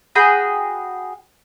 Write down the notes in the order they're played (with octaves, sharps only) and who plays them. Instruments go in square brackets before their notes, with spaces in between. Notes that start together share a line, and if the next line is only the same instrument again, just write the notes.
[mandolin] F#4 G#4 G5 B5